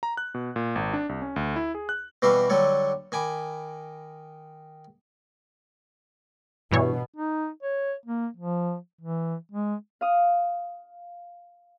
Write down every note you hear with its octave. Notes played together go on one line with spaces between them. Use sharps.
A#5
F#6
B2
A#2
G#1
D4
C2
C#4
D2
E4
G#4
F#6
B2 E3 G3 F#4 E5 F5
D3 F#3 G3 A4 C#5
D#3 G#5 B5 D6
G2 B2 E3 C#5
D#4
C#5
A#3
F3
E3
G#3
F5 D#6